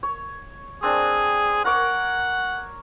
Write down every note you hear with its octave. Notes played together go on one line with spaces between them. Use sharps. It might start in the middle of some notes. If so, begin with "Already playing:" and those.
C#5
C4 D4 G#4 C5
A#4 C#5 F#5 D6